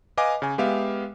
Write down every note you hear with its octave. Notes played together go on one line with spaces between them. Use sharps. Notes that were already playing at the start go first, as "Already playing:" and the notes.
B4 D#5 F5 G#5 D6
C#3 G#5
G#3 B3 G4 E5 F5